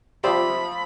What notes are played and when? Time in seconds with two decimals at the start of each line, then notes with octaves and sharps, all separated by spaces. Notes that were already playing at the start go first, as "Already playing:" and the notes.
0.24 C3 F3 G4 C5 D5 B5 E6